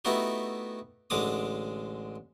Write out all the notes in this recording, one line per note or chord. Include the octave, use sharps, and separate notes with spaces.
A3 B3 D#4 E4 F#4 G4
A1 D3 G#3 D6 D#6